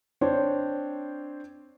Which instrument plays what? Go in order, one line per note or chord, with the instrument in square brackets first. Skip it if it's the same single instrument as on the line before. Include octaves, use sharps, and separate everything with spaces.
[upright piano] C4 D4 C5 C#5